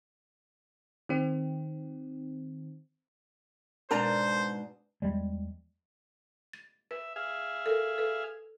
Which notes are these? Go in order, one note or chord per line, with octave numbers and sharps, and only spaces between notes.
D#3 C4
G#2 B2 D4 A#4 C5 D5 A#5
E2 F3 G3 G#3
A6
B4 E5
G#4 E5 F5
A4 A#4
A4 B4